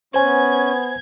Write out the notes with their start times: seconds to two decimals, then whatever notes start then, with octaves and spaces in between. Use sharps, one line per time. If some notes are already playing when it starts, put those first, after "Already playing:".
0.14 B3 C#4 C5 G#5 G#6